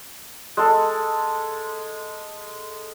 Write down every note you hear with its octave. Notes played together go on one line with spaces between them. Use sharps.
G#3 A4